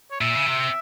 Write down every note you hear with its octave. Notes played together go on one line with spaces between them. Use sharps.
C#5
A#2 E5
C#3
C3